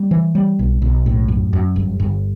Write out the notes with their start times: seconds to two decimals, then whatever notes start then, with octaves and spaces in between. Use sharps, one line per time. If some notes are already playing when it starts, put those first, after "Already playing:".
Already playing: G3
0.11 E3
0.35 G3
0.59 B1
0.82 B1
1.06 A2
1.28 F#2
1.53 F#2
1.76 G1
2.00 G1